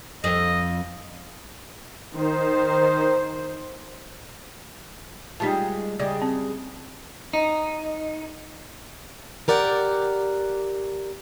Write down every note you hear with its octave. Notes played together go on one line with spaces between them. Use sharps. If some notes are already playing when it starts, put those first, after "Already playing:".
F2 D#5
D#3 C5
G3 G#3 D#4 F4 G4 A5
C#3 G3 G#3 D5
C4
D#4
G4 A#4 D5 F#5 G5